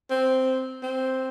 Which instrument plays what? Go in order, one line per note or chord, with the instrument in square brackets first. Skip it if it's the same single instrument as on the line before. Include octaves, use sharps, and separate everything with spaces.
[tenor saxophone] C4
C4